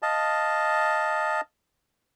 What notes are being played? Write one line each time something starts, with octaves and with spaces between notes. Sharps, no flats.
D#5 F5 A5